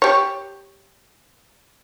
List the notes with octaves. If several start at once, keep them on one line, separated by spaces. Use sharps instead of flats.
G4 C#5